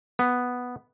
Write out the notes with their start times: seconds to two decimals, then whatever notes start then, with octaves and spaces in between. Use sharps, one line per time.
0.19 B3